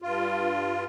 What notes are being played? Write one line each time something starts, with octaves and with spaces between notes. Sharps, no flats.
G2 F4